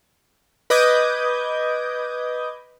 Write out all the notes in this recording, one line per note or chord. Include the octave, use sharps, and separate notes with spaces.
B4 D#5 D6 D#6 G6 G#6